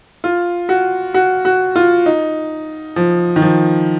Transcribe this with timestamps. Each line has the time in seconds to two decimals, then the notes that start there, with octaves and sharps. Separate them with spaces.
0.24 F4
0.69 F#4
1.14 F#4
1.45 F#4
1.76 F4
2.06 D#4
2.96 F3
3.36 D#3
3.42 F3